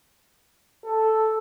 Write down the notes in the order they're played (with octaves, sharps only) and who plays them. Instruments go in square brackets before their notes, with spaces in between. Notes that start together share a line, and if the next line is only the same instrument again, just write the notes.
[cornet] A4